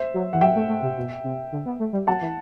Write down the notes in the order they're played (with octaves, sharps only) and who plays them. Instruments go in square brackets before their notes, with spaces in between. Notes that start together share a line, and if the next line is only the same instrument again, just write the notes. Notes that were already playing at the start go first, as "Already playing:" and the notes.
Already playing: [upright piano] C5 E5
[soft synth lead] F#3
[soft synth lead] E3 [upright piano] F#5
[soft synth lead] F#3 [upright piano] E5 G5
[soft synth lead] A3
A3
C3
B2
C3
D3
B3
A3
G3
[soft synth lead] F#3 [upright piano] F#5 A5
[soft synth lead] E3